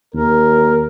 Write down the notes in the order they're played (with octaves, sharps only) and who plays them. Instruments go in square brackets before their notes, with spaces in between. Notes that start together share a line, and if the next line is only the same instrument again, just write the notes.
[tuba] D#2 [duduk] A#4